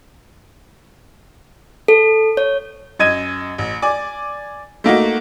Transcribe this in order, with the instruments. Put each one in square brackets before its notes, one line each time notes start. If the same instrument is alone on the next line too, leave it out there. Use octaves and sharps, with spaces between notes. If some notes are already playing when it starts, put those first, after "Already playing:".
[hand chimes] A4
C#5
[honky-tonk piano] F#2 D#5 G#6 D#7
A1
D5 G#5 D6
A3 A#3 D#4 F#4